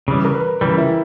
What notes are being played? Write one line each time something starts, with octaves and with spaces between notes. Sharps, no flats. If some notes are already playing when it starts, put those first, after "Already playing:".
C#3 E3 G3
A#4
B4
C#3 E3 G3 A#4
E4